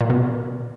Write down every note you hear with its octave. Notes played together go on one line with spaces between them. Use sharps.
A#2
B2